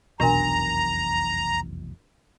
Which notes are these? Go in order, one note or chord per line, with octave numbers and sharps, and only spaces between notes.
F1 B1 E2 B2 D4 A#4 A#5 C6